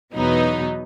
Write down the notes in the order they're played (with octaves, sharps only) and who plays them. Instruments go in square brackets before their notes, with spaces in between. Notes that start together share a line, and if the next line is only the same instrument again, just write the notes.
[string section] E2 B2 F#3 B3 D#4